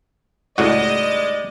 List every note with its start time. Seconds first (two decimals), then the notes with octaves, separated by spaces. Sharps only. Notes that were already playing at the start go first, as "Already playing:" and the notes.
0.58 C#2 A2 G3 G#3 D#4 F#4 D5 D#5